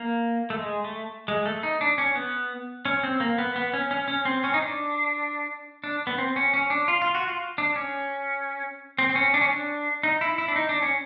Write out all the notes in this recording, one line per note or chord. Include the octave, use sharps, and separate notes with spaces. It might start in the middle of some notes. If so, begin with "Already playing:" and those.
Already playing: A#3
A3
G#3
A3
G#3
A3
D#4
D4
C#4
B3
C#4
C4
A#3
B3
B3
C#4
C#4
C#4
C4
C#4
D#4
D4
D4
B3
C4
C#4
C#4
D4
F4
F4
F#4
F4
D4
C#4
C4
C4
C#4
D4
C#4
D4
D#4
E4
E4
D4
D#4
D4
C#4